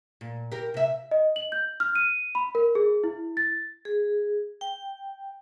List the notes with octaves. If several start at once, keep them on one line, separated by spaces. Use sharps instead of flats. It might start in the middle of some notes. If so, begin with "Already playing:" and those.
A#2
G4 A#4
C3 E5
D#5
F#7
G6
F6
D#7
B5
A#4
G#4
E4
A6
G#4
G5